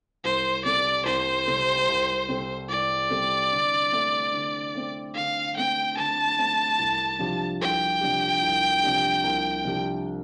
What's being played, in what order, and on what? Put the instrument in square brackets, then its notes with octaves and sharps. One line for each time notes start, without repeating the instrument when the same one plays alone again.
[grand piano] C2 [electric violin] C5
[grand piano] C3 G3 C4 A4 [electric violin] D5
[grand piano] C2 [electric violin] C5
[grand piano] C3 G3 C4 A4
C2
C3 G3 C4 A4
[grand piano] C2 [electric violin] D5
[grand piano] C3 G3 C4 A4
D3
A3 C4
D3
A3 C4
[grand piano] D3 [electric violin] F5
[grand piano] A3 C4 [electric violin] G5
[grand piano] D3 [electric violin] A5
[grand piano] A3 C4
C2
C3 F3 D4 G4
[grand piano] C2 [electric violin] G5
[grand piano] C3 F3 D4 G4
C2
C3 F3 D4 G4
C2
C3 F3 D4 G4